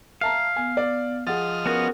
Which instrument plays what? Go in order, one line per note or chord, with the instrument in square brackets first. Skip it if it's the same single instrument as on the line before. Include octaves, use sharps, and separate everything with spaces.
[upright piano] E5 A5 A#5 [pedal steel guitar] F5
[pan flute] B3 [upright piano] G#5
[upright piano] D5
[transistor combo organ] F3 D#5 F6 [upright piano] G#4 F#5 A6
[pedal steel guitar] B3 C#4 F#4 [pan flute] A#4